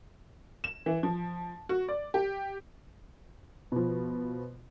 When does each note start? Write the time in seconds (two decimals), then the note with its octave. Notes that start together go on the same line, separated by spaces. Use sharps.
0.64 E7
0.86 E3
1.03 F3
1.69 F#4
1.88 D5
2.14 G4
3.72 B2 F3